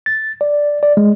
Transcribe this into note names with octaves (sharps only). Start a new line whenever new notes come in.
A6
D5
D5
G#3